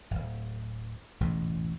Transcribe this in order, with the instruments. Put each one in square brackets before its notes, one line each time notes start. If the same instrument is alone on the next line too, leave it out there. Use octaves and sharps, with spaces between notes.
[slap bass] D1 G#1
E1 A1 E2 G#2